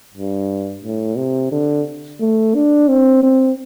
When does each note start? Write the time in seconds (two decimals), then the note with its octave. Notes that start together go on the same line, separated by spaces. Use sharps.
0.14 G2
0.84 A2
1.17 C3
1.51 D3
2.20 A3
2.55 D4
2.89 C4
3.23 C4